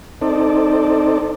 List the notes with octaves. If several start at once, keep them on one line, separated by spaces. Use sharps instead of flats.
C4 D#4 A4 D5